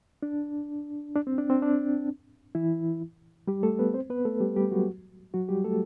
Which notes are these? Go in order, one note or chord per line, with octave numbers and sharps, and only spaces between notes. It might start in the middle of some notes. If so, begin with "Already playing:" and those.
D4
D4
C4
D4
C4
D4
E3 E4
G3 G4
A3 A4
B3 B4
C4 C5
B3 B4
A3 A4
G3 G4
G3 G4
F#3 F#4
F#3 F#4
G3 G4
A3 A4